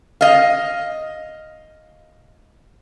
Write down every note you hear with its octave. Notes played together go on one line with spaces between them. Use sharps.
D#5 F5